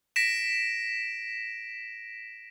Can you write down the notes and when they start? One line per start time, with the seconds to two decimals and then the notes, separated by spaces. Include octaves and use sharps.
0.16 A#6 B6 D7 E7